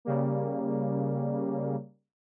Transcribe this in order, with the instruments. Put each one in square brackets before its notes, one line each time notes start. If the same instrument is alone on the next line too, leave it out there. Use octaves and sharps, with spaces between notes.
[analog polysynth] C#3 G3 A#3